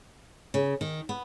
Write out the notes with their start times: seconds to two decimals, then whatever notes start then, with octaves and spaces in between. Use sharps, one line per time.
0.54 C#3
0.81 D#3
1.09 B3